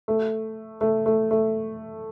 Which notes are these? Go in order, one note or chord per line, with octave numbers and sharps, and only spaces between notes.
A3
A3
A3
A3